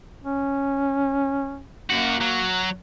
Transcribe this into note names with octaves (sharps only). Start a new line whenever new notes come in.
C#4
F#2 A#3 F#4
F#3